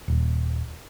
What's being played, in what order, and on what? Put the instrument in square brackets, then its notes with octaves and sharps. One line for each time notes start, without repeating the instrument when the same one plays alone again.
[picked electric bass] D#1